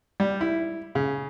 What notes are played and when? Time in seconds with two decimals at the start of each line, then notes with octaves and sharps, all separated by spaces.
0.20 G3
0.41 E4
0.95 C#3